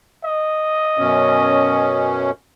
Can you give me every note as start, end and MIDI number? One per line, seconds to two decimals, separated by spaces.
0.25 2.24 75
0.98 2.31 42
0.98 2.31 47
0.98 2.31 61